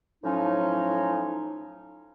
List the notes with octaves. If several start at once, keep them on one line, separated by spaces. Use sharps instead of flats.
A2 F3 F#3 C#4 D#4